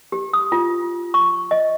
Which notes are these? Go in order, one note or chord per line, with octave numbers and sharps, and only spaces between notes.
G4
D#6
F4
C#6
D#5